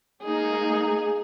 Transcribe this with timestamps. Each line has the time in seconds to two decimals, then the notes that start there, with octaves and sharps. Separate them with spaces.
0.23 G#3 A#3 D#4 G#4